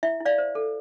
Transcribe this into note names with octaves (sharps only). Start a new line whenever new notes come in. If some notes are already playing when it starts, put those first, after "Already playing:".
E4 E5
E4
D5 F5
C5
A4